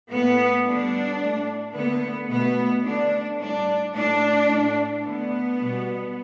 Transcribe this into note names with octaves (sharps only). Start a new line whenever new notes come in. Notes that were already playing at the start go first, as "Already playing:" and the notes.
A2 A3 B3
D3 G3 D4
A2 A3
D3 A3 B3
B2 A3 B3
D3 A3 D4
A2 G3 D4
A2 A3 D4
A2 A3
D3 A3 B3
B2 G3